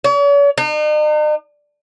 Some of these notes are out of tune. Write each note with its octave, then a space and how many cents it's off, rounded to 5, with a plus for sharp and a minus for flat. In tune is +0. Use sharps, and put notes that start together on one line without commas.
C#5 +45
D#4 -45